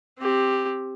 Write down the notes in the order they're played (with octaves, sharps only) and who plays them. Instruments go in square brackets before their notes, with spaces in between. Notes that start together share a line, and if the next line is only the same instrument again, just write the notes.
[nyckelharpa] C4 G4